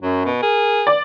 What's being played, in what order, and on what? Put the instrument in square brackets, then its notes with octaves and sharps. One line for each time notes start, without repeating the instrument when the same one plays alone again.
[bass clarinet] F#2 [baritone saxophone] F#3
[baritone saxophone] B2
[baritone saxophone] G#4 [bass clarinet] A#4
[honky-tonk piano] D5